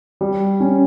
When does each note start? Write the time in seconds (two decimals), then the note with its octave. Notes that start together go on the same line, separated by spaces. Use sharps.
0.21 G3
0.60 C#4